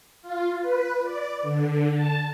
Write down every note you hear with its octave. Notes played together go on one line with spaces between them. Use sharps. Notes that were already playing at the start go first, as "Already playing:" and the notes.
F4
B4
D5
D3
A5